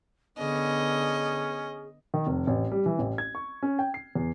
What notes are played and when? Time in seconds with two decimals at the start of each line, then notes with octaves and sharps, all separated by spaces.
0.39 D3 B3 C#4 G#4 D#5
2.14 D#3
2.27 F1
2.47 A1
2.71 G3
2.86 E3
2.99 A1
3.18 G#6
3.35 C#6
3.63 C#4
3.79 G5
3.94 C7
4.15 E2